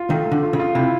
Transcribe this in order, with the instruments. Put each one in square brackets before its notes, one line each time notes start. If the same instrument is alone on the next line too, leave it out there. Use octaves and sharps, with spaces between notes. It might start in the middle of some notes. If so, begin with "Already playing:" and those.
Already playing: [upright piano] F4
[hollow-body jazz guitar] D#3 [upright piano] A3
[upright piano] A3
[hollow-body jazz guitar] D3
[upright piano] F4
[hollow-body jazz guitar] C#3
[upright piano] F4
[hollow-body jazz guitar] C3 [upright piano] E4